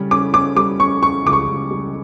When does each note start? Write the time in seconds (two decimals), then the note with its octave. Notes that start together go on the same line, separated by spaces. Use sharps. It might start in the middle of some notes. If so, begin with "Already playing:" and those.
Already playing: C#3 G3 C#4
0.11 C#4 D6
0.34 C#4 D6
0.56 G3 D6
0.79 C#4 C#6
1.03 C#4 C#6
1.25 C#2 D6
1.33 C#6
1.48 C#2
1.71 G3